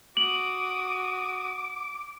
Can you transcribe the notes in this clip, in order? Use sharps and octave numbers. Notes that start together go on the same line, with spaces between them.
F#4 D6 D#6 F#7